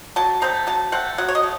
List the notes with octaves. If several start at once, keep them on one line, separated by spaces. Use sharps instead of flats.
F#3 A5
A3 C4 A#5
F#3 A5
A3 C4 F#5
F#3 F#5
C#5
D#5
A3